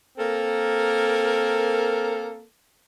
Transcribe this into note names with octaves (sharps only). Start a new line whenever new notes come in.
A#3 C4 A4 A#4